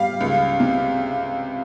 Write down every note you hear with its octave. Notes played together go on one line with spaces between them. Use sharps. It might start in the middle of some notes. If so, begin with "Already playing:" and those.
Already playing: G3 F5
C#2
C3